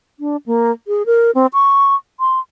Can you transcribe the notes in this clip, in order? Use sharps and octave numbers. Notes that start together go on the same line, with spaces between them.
D4
A#3
G#4
A#4
C4
C#6
C6